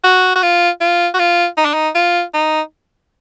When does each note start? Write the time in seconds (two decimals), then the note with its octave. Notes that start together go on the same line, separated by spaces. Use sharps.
0.04 F#4
0.35 F#4
0.43 F4
0.81 F4
1.14 F#4
1.19 F4
1.57 D#4
1.65 D4
1.74 D#4
1.95 F4
2.34 D#4